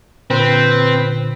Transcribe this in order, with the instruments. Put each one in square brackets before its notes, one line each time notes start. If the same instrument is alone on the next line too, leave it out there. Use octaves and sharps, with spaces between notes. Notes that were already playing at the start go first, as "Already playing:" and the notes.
[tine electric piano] A#2 D3 [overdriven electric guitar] C4 [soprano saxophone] B4